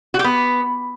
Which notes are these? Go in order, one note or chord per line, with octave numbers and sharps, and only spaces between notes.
F#4
G4
B3